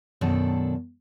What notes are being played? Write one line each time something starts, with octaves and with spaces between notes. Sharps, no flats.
F#2 B2 D#3 D4 A4